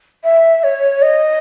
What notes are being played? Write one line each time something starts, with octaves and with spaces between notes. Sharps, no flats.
E5
C#5
D#5